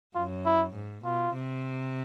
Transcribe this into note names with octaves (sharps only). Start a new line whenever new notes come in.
F#2 F4
E4
G#2
B2 F4
C3